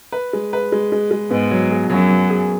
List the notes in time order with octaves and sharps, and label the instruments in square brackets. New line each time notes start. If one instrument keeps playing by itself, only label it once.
[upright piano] B4
G#3
B4
G#3
G#3
G#3
[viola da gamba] G#2 [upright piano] B3
[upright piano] F#3
G#4
[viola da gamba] F#2 [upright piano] F#3
[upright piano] F#3
G#4